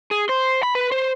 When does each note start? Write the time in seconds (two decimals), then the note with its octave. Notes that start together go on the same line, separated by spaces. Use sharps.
0.11 G#4
0.29 C5
0.63 B5
0.75 B4
0.92 C5